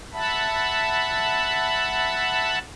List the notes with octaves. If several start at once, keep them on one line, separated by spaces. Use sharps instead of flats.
E5 F#5 A5 B5